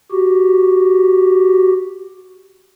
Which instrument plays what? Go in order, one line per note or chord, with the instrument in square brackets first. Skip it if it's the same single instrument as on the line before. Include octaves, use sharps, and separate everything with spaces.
[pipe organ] F#4 G4